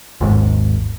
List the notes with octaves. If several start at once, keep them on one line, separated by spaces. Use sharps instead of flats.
G#1 D#2 G#2